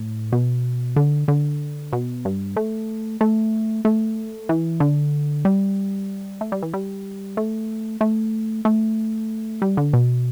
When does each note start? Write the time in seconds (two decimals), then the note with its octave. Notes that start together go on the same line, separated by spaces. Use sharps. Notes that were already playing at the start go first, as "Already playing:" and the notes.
Already playing: A2
0.32 B2
0.96 D3
1.28 D3
1.93 B2
2.25 G2
2.57 A3
3.21 A3
3.85 A3
4.49 E3
4.80 D3
5.45 G3
6.41 A3
6.52 G3
6.62 E3
6.74 G3
7.37 A3
8.01 A3
8.65 A3
9.62 G3
9.77 D3
9.93 B2